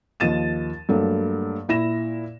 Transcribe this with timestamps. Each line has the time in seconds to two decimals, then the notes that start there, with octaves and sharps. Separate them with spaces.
0.20 D#2 F3 D#5 A6 D#7 E7
0.89 G2 F#3 A3 A#3
1.69 A#2 E4 A#6 E7